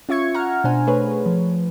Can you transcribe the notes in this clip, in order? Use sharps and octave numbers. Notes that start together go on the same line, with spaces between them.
C#4 F4 E5 C#6 G#6 C#7
F#5 A#5 F6
B2 D4 C5 G#5
A3 G#4 B4 C#5
F3